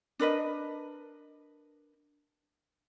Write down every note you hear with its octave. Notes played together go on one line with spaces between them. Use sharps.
D4 A#4 B4 D#5